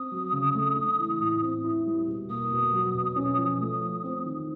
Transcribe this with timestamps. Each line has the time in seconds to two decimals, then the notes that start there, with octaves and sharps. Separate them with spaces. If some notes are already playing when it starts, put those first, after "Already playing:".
Already playing: C4 D#6
0.12 F#3
0.32 C#3
0.55 A3
0.76 D4
0.99 E3
1.20 A2
1.42 C4
1.64 E4
1.86 G3
2.07 B2
2.29 A#3 D#6
2.51 B2
2.73 F#3
2.94 B2
3.16 C#4
3.38 F3
3.60 A3
3.82 F3
4.04 C4
4.26 D#3